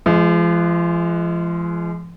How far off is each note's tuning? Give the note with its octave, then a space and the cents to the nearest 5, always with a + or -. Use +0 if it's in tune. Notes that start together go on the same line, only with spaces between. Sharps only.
F3 -35 G#3 +15